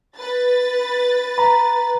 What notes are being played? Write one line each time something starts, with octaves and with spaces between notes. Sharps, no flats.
B4 A6
A#5 B5